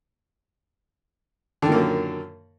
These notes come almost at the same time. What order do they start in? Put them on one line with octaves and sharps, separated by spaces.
D3 D#3 A#2 A#3 F#2